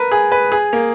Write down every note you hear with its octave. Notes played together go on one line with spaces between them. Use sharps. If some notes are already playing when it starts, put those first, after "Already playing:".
Already playing: A#4 B4
G#4
B4
G#4
A#3